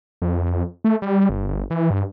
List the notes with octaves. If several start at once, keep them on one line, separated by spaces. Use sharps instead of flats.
F2
A3
G3
G1
G1
E3
G2